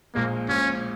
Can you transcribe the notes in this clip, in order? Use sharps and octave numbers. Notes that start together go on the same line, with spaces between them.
A#1 A#2 G#3 A#3
A#1 A#2 G#3 C#4